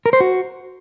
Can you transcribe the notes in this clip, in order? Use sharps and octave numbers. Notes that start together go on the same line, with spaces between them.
A#4
C5
F#4